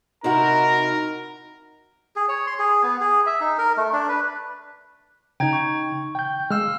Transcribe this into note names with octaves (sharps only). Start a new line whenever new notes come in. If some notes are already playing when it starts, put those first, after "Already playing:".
C3 D#4 E4 F#4 A#4 A#5
G#4
C#5
C6
G#4
B3
G#4
E5
D#4
A#4
A3
D4
B4
C#3 D#4 G5 A#5 G#6
C#6
G5 G6
G#3 F5 E6 F6